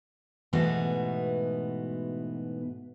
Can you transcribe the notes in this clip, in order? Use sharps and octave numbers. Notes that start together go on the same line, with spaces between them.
G#2 B2 E3 A3 B3 F#4